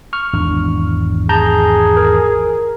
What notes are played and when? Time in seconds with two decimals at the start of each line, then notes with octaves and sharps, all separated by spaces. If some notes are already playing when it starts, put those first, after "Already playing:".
0.13 C#6 F6
0.33 G#1 E2 D4
1.29 G#4 A5 A#5 G6
1.97 A#4